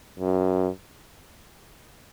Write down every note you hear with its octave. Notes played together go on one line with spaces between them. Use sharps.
F#2